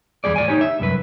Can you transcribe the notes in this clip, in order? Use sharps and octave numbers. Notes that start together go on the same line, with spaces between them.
E2 B2 G3 G#4 D5
A2 D5 G#5
D#4 G4 C#5
E5
C2 F#2 B4